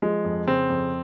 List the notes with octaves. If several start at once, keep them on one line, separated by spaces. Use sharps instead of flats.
F3 G#3
F2
C#3 C4
F2